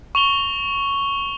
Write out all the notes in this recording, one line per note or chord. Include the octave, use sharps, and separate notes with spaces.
C#6 F7 G7